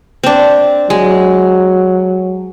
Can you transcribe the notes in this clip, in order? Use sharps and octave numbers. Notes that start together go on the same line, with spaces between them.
C4 D4
F#3 G#3